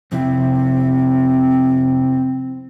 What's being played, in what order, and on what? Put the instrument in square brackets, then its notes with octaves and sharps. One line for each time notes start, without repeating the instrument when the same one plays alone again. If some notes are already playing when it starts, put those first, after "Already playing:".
[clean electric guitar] F2 C3 E4 [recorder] C4